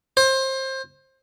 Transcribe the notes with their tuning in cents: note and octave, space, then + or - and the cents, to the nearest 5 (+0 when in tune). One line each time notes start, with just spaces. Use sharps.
C5 +25